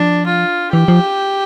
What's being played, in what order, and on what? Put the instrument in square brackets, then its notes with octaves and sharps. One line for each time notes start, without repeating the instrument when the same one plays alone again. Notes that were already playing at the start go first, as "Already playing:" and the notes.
Already playing: [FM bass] F3 [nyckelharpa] D4
[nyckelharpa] F4
[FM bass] E3 [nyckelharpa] G4
[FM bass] F3